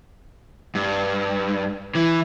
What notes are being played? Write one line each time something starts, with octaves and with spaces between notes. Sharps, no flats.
G2
E3